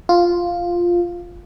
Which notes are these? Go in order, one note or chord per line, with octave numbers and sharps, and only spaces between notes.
F4